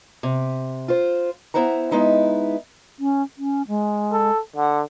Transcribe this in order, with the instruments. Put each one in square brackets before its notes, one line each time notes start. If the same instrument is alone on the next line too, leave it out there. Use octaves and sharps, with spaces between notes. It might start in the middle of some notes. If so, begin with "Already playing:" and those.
[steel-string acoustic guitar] C3
F4 C5
B3 E4 C5 F#5 A#5
G#3 B3 D#4 E4
[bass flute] C#4
C#4
G#3
[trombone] A4
[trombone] D3 [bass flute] F#5